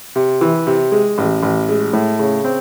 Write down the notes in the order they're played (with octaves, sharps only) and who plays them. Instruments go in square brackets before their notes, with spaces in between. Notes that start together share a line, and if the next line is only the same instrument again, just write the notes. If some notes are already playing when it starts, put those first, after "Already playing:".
[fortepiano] C3
E3
C3
G#3
A1
A1
G#3
A2
C#3
C4